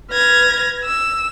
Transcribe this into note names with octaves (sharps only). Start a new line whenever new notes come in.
B4 F6 G#6 A#6
E6